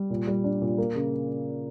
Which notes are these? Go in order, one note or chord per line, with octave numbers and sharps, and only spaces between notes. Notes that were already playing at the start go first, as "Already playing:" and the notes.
Already playing: G3
A#2
G3
D4
A#2
A#3
C#3